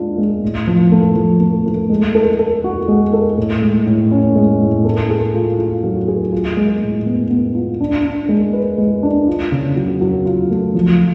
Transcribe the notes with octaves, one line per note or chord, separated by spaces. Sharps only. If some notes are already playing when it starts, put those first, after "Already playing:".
Already playing: G#3 D4 F4
G#3
A2
F3
A3
F3
A3
A3
G#3
A4
A4
F#4
G#3
A4
A2
G#3
A2
C#4
G#3
A2
A3
G#4
F4
F4
F#3
G#4
F4
G#3
A2
B3
B3
F4
D4
D4
G#3
B4
G#3
D4
F4
C#3
F#3
F#3
F4
A3
F3